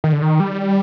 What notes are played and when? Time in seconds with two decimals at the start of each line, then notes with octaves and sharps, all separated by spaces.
0.04 D#3
0.12 D3
0.22 D#3
0.40 G3